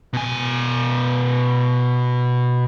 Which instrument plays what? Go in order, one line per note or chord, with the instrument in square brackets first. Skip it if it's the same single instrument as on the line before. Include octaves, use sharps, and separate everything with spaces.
[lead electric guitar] B2 G#5